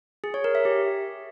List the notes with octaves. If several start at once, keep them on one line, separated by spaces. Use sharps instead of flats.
G#4
C#5
A#4
E5
G4